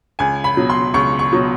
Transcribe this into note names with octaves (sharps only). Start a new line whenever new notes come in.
C#2 G#5
B5
B2 F#3
C6
C#2 C#6
C#6
B2 F#3